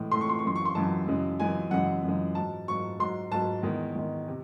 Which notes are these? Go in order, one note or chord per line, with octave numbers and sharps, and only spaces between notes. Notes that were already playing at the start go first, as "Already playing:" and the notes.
Already playing: A2 E3 G#3
A2 E3 G#3 C6
C#6
C6
C#6
F#2 E3 G#3 C6
C#6
C6
F#2 E3 G#3 A5
F#2 C#3 E3 G#3
F#2 C#3 E3 G#3 G#5
F#2 C#3 E3 G#3 F#5
F#2 C#3 E3 G#3
G#2 F#3 A5
G#2 F#3 C#6
G#2 F#3 C6
G#2 F#3 A5
E2 D#3 G#3
E2 D#3 G#3
C3